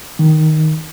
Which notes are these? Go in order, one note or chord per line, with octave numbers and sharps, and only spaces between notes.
D#3